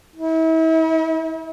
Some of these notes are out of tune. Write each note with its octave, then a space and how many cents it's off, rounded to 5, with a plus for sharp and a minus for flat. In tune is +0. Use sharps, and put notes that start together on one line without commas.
E4 -40